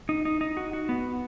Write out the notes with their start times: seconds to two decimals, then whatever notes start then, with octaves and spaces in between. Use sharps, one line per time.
0.09 D#4
0.25 D#4
0.41 D#4
0.57 F#4
0.73 F#4
0.89 B3